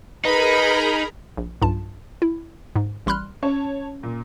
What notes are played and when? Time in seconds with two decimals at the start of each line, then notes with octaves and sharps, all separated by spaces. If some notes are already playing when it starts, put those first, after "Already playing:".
0.25 D#4 G#4 A#4 B4 A#5 B5
1.37 A#1
1.62 B1 G2 F4 A5
2.22 E4
2.76 G#2
3.06 A1 G3 B5 C6 F6 F#6
3.43 C#4 C#5 A5
4.03 A#2